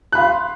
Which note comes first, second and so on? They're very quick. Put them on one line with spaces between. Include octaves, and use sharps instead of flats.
F#6 B5 F5 C6